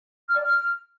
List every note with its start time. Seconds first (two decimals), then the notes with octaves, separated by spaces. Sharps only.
0.28 F6
0.35 D5
0.43 F6